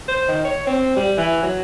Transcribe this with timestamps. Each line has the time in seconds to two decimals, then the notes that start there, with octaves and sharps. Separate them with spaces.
0.08 C5
0.28 D#3
0.45 C#5
0.67 C4
0.96 G3
1.18 E3
1.42 F#3